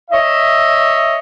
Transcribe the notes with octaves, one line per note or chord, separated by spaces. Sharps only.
C#5 D#5 E5